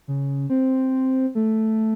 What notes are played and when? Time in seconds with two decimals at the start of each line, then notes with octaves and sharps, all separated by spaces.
0.08 C#3
0.50 C4
1.35 A3